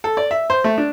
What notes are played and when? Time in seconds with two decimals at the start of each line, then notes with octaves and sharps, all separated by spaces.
0.04 A4
0.17 D5
0.31 E5
0.50 C5
0.64 A3
0.78 D4